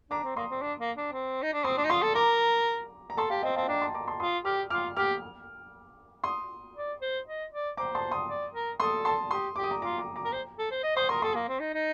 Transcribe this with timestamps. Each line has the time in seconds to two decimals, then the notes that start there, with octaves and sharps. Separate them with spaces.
0.11 D4 A#5 D6
0.23 C4
0.36 A#3 C6 D#6
0.50 C4
0.62 D4
0.80 A#3
0.97 D4
1.13 C4
1.42 D#4
1.53 D4
1.64 C4 C6 D#6
1.77 D4
1.85 D#4
1.90 F4 C6 D#6
2.02 A4
2.15 A#4 A#5 D6
3.10 A#5
3.17 A4 A5 C6
3.30 G4 F5 A5
3.43 C4 D#5 G5
3.56 C4 F5 A5
3.68 D4 G5 A#5
3.82 A5 C6
3.94 A#5 D6
4.07 A5 C6
4.20 F4 C6 D#6
4.45 G4 D6 F6
4.70 F4 D6 F6
4.96 G4 D6 F6
6.24 C6 D#6
6.75 D5
7.01 C5
7.27 D#5
7.52 D5
7.77 C5 A#5 D6
7.95 A5 C6
8.11 C6 D#6
8.29 D5
8.54 A#4
8.80 A4 C6 D#6
9.05 A5 C6
9.31 G4 C6 D#6
9.56 G4 D6
9.64 D#6
9.71 A#5 D6
9.82 F4 A#5 D6
9.98 A#5 D6
10.16 A#5 D6
10.25 A#4
10.33 C5
10.59 A4
10.71 C5
10.83 D#5
10.96 C5 C6 D#6
11.09 A#4 C6 D#6
11.22 A4 C6 D#6
11.35 A#3
11.48 C4
11.60 D#4
11.74 D#4